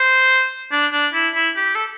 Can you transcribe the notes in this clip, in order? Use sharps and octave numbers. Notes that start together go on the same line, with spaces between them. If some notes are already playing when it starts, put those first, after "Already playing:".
Already playing: C5
D4
D4
E4
E4
G4
A4